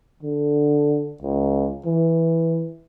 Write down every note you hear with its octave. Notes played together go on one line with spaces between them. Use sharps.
D3
C#2
E3